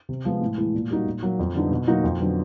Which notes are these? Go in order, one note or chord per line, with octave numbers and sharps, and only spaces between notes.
C3
F3 G#3 B3
A2
E3 G#3
A#2
G3 A#3 D#4 F#4
A#2
F#3 A#3
F2
D3 G3 B3 D#4
B2
F#3 A#3 D#4 F#4
F2
D3 F#3 B3